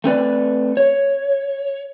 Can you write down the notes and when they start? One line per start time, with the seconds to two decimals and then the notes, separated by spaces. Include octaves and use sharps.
0.04 A3 C4 B4 D5
0.77 C#5